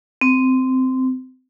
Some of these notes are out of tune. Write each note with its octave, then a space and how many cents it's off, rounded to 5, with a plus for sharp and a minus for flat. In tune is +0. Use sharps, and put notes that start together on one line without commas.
C4 -15